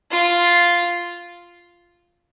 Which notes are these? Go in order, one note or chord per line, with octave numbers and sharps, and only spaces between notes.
F4